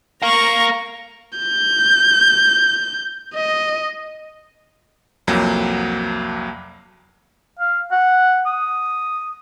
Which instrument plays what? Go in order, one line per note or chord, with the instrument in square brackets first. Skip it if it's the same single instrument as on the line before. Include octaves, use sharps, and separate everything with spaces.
[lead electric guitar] A#4 F5 [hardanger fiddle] A#5 C#6
[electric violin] G6
D#5
[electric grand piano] C2 F2 F#3 A#3
[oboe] F5
F#5
D#6